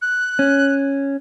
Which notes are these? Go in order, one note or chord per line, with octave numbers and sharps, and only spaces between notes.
F#6
C#4